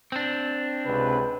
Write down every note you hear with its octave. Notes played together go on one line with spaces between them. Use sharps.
C4 D4
C#2 C3 B4